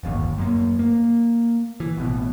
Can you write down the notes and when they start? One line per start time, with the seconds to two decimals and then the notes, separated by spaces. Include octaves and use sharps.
0.03 D1 G1 D#2
0.38 F#2 A#3
0.79 A#3
1.80 E3
1.97 A1 B2